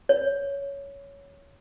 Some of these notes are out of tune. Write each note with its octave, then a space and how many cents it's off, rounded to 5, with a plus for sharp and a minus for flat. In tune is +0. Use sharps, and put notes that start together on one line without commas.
C#5 +10